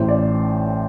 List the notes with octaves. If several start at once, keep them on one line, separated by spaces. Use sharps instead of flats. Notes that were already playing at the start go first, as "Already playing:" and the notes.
Already playing: A1 A2 C5
D5